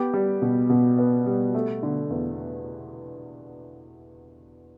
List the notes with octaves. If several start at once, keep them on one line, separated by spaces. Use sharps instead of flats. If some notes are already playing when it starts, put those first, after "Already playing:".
Already playing: B3 G4 G5
G3
B2
B2
B3
G3
A3
D3
E2